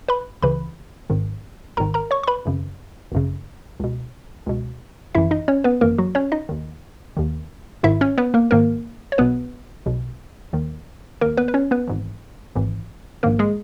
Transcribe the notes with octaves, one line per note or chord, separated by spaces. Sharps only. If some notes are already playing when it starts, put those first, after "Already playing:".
B4 B5
C#2 C#3 E3 B4 B5
G#1 G#2 D#3
G#1 G#2 D#3 A#4 A#5
A#4 A#5
C#5 C#6
C#6
B4 B5
G#1 F#2 C#3
G#1 F#2 C#3
C#2 B2
C#2 B2
G#1 F#2 E3 E4 E5
D#4 D#5
C#4 C#5
B3 B4
G#1 F#2 E3 A#3 A#4
F#3 F#4
C#4 C#5
D#4 D#5
D#2 D#3
D#2 D#3
G#1 G#2 D#3 E4 E5
C#4 C#5
B3 B4
A#3 A#4
G#1 G#2 D#3 A#3 A#4
C#5
B1 B2 B3 B4
B1 B2
D#2 D#3
D#2 D#3 A#3 A#4
B3 B4
B4
C#4 C#5
B3 B4
G#1 G#2 E3
G#1 G#2 E3
A#1 G#2 D#3 A#3 A#4
G#3 G#4